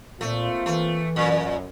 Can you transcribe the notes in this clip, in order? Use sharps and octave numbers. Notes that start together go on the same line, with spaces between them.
A#2 A3 A#3 C4 F4
E3 A3
F#2 A#2